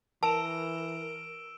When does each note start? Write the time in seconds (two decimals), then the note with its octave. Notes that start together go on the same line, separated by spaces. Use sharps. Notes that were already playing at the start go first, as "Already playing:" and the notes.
0.23 E3 A#4 A5 E6 D7 E7